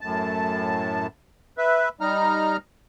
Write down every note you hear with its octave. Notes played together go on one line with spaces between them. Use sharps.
F#2 A2 A5
B4 E5
G3 D#4 A#5 F6